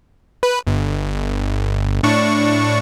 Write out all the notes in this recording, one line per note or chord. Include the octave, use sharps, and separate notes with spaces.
B4
G1
A2 D4 C#6